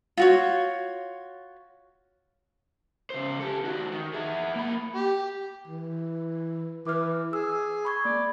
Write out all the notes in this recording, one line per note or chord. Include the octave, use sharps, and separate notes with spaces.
F4 F#4 C#5
C#3 C5
G4 A4
D#3 F#4
D#3
E4 G#4
A#3 B5
G4
E3
E3 D6 F6
G#4 E6
B5 C#6 G#6
A#3 D5